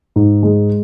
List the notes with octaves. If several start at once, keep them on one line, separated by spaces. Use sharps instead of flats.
G#2
G#3